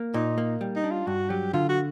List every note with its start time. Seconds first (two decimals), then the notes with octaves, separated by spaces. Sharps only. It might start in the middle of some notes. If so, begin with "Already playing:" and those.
Already playing: A#3
0.14 A#2 D#4
0.38 A#3
0.61 G3
0.76 D#4
0.84 D4
0.91 F4
1.07 G2 F#4
1.30 F#3 G4
1.53 D3 F4
1.69 F#4